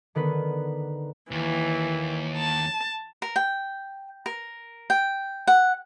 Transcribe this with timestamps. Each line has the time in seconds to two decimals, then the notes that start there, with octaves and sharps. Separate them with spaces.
0.15 D3 D#3 B3 B4
1.31 D#2 E3
2.38 A5
3.22 A#4
3.36 G5
4.26 A#4
4.90 G5
5.47 F#5